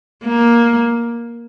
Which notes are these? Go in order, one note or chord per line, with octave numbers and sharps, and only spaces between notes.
A#3